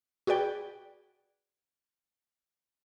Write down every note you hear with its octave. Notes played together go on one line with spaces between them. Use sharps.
F#4 G#4 B4 D5 G5